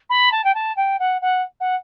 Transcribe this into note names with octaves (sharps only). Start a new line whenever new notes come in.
B5
A5
G5
A5
G5
F#5
F#5
F#5